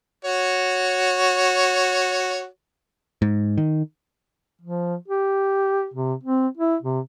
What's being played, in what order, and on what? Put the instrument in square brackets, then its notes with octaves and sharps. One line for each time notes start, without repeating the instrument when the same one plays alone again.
[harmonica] F#4 C#5
[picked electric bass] G#2
D#3
[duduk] F3
G4
C3
C4
E4
C3